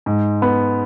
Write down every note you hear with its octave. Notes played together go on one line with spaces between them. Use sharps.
G#2
B3